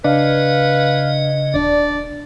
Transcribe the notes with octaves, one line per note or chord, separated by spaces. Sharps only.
C#3 D4 B4 D#5 F5
D#1 D4 D5